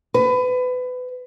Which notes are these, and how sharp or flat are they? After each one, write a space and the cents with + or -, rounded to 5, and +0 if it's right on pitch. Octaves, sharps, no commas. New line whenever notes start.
B4 +25